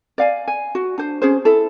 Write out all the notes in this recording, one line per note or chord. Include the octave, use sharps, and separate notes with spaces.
D5 F5 G#5
G#5
F#4
D4 C5
C#4 G#4 C5
E4 A4